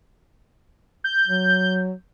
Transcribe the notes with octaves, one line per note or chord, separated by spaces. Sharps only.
G6
F#3